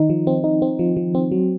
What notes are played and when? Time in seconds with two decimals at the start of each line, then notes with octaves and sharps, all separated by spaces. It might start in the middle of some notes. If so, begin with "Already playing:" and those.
Already playing: D#3 D#4
0.10 F3
0.27 C4
0.44 D#4
0.62 C4
0.79 F3
0.97 F3
1.15 C4
1.31 F#3